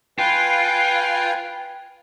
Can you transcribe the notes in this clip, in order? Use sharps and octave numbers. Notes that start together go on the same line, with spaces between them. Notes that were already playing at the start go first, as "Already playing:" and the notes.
F4 B4 G5 G#5